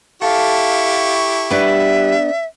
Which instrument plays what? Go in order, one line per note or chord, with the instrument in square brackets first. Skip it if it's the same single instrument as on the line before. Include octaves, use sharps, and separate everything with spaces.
[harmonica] E4 G4 C#6 [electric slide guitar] A4 [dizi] F5
[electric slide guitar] G3 B4 [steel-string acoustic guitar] B3 D4 [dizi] E5